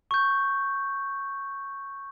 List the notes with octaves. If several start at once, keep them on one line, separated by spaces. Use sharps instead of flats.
C#6 G6